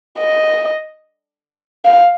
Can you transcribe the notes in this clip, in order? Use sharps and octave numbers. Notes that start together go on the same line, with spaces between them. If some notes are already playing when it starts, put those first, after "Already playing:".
D#5
F5